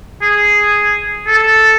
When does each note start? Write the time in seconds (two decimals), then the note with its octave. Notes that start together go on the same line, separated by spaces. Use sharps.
0.22 G#4
1.27 A4